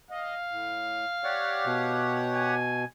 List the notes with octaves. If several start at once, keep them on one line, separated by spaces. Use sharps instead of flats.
D#5 F5
A2
G4 C#5 D5 F#5
B2
G#5